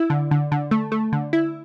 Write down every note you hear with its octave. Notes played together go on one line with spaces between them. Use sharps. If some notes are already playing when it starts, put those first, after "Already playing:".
Already playing: E4
D3
D3
D3
A3
A3
D3
E4